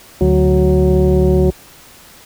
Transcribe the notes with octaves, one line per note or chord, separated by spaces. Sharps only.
D2 F#3